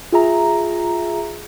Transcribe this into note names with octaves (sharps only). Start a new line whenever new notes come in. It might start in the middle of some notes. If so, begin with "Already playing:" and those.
F4 G#4 E5 A#5